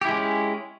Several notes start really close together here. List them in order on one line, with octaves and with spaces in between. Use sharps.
G4 E4 G#3 C#4